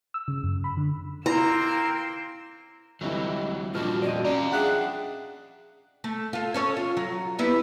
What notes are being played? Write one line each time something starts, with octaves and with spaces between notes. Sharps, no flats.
E6
C#3
F#2
B5
D3
A#3 C4 E4 A#5 C6 E6
D2 C3 E3 F#3 G3 D#5
A#2 F3 G3 A#3 D4 F4 F#4
F2 F3 F#4 D5 D#5
C#4 D5 D#5 F5 A#5
D4 G#4 E5 F#5 G5 F#6
A3
F4 A4
C#4 A4 C#5
F4
F#3
G3 B3 E4